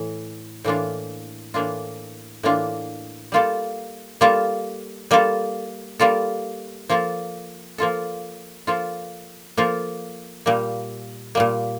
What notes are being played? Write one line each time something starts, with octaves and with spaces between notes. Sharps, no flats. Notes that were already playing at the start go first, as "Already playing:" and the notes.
Already playing: A2 E3
A2 E3 A#3 D4 F4
A2 E3 A#3 D4 F4
A2 E3 A#3 D4 F4
G3 A#3 F4 A4
G3 A#3 F4 A4
G3 A#3 F4 A4
G3 A#3 F4 A4
F3 A#3 F4 A4
F3 A#3 F4 A4
F3 A#3 F4 A4
F3 A#3 F4 A4
A#2 G3 A#3
A#2 G3 A#3